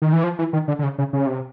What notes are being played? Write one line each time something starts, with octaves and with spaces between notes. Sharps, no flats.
D#3
E3
F3
E3
D#3
D3
D3
C#3
C#3
C#3
C3